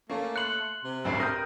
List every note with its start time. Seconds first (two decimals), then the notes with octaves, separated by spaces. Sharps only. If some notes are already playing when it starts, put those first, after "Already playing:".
0.10 A3 A#3 C#4
0.36 C6 F#6 C#7 F#7
0.84 C3
1.04 A1 D2 G2
1.20 A#4 G5 D#6 F6